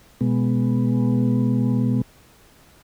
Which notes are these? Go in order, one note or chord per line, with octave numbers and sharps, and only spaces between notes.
B2 G#3 B3